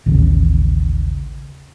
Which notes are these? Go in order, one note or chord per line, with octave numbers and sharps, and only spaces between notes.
A1 D#2 C#3